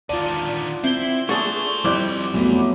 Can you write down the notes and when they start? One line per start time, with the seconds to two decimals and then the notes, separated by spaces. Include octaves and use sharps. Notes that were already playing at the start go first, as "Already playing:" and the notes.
0.09 D3 D#3 F4 D5
0.84 C4 E4 G7
1.29 A3 D4 F#4 G#4 C5 C#6
1.84 F2 G3 E4 D6
2.34 E2 F#3 A3 B3